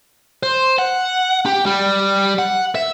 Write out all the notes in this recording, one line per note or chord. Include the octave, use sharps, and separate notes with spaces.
C5
F#5
G4
G3
F#5
E5